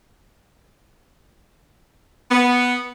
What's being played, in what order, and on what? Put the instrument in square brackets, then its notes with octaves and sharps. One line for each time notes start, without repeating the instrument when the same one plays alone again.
[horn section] B3